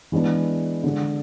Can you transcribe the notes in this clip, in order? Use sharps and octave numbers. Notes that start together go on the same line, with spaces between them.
E3 G#3 B3 D4
D3 G#3 D4